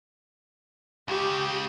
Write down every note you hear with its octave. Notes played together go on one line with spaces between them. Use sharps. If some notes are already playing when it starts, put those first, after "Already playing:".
C#2 C#3 G4